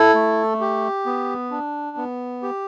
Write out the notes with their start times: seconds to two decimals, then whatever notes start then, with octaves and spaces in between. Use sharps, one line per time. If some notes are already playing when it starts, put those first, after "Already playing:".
Already playing: E4 A4
0.14 A3
0.60 G4
1.06 B3
1.51 D4
1.97 B3
2.42 G4